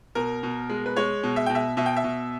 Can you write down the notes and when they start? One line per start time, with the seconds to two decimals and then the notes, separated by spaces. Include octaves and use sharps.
0.15 B2 A#4
0.43 B2
0.70 G#3
0.86 B4
0.96 G#3 C#5
1.24 B2
1.36 E5
1.46 B2 G5
1.55 E5
1.77 B2 E5
1.86 G5
1.96 E5
2.04 B2